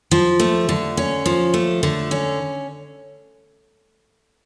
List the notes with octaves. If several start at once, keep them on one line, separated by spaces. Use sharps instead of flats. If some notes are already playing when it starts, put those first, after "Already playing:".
F3
A3
D3
C#4
F3
A3
D3
C#4